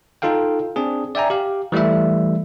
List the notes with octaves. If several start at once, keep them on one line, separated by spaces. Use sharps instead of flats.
D#4 F4 A4 F5 G5
C4 D4 G#4
D5 E5 G5 G#5 A#5
G4 F5
E3 G3 A3 E4 E5